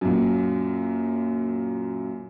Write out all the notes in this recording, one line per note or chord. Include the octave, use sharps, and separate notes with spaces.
F#2 A#2